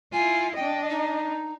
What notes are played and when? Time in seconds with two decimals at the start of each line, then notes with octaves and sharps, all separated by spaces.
0.13 E4 F4 G#5
0.56 D4 D#5 G5
0.90 D#4